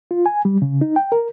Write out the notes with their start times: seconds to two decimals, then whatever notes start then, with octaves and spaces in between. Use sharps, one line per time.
0.11 F4
0.26 G#5
0.45 G3
0.62 C#3
0.81 D#4
0.96 G5
1.12 A#4